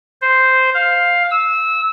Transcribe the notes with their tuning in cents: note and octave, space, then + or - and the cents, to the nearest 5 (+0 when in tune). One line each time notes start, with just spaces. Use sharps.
C5 -5
F5 +5
E6 -20